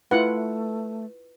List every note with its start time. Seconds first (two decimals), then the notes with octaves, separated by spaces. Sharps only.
0.11 A3 E4 F4 B4 F#5